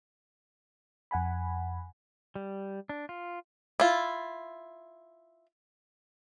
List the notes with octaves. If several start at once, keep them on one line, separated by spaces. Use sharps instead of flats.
F2 F#5 G#5 B5
G3
D4
F4
E4 F4